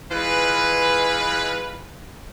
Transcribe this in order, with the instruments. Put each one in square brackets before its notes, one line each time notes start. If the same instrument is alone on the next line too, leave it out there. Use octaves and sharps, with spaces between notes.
[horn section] E3 G#3 F4 B4